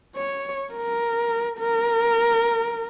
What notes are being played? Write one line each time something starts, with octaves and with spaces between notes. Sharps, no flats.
C#5
A#4
A#4